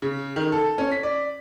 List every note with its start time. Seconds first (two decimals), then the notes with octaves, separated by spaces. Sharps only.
0.02 C#3
0.36 D#3
0.52 A4
0.78 C#4
0.92 B6
1.03 D5